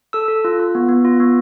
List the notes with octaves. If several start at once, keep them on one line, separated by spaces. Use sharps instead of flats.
A4 E6
A4
F4
F4
B3
B3
F4
B3